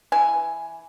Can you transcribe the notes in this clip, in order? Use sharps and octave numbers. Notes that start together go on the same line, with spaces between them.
E3 G#5